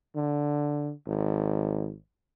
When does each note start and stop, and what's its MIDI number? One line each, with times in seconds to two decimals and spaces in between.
0.16 0.91 50
1.07 1.95 32